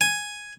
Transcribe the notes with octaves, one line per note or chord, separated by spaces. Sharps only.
G#5